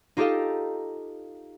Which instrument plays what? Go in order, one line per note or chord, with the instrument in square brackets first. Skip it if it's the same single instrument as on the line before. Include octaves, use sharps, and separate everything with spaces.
[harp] D#4 F4 G4 A4 D#5 F5